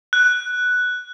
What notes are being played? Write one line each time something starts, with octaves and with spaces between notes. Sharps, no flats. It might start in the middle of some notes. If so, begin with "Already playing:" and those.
F#6